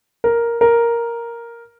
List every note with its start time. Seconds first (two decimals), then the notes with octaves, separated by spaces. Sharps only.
0.24 A#4
0.61 A#4